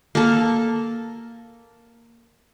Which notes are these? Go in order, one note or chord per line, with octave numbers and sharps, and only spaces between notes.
A#3 A4